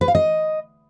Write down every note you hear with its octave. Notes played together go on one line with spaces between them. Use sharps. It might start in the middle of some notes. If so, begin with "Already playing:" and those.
B4
F5
D#5